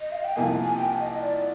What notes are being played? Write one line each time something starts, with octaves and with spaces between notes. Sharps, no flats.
D#5
F5
G5
C2 C3 F3 A#3 D#4 G#5
G#5
G5
D#5
D5